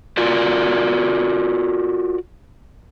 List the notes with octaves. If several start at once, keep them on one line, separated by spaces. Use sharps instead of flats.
F4 F#4 A#4 D5